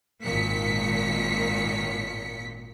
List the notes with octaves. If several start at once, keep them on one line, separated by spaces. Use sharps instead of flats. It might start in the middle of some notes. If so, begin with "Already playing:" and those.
G#1 A#2 D#3 B6 C#7